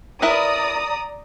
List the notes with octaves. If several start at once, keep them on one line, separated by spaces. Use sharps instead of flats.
E4 A#4 B4 D5 A#5 D#6